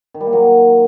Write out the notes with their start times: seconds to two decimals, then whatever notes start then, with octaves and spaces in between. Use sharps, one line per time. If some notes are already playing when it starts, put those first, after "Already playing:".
0.14 D#3
0.21 G3
0.27 A#3
0.33 F#3